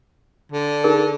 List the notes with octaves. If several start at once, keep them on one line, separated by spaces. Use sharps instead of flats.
D3
D#4 G#4 A#4